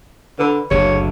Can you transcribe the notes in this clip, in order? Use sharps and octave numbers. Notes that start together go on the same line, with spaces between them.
D3 B4 B5
F#1 D2 D3 G#4 C#5